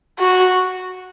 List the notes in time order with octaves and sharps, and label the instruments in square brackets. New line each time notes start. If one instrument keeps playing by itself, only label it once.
[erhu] F#4